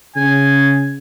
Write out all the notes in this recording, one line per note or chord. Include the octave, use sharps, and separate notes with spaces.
C#3 G#5